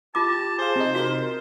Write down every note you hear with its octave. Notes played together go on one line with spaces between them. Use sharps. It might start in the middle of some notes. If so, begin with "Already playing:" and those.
F4 G4 A5 D6
G#4 C5 F5
C3 D#4
F#4 A#4